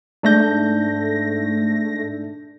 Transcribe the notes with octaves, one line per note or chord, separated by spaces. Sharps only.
G#2 A3 D4 G6 A#6